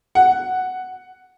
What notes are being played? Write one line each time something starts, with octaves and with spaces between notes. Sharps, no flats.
F#5